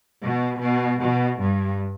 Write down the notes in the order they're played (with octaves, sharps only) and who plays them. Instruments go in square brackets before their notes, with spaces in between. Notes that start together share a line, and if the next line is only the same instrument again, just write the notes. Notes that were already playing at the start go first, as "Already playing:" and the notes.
[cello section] B2
B2
B2
G2